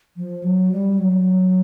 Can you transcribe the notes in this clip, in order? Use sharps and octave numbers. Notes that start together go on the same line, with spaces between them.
F3
F#3
G3
F#3